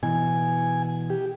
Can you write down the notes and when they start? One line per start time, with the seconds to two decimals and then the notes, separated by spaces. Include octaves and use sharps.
0.03 B2 E3 G#5
1.10 G4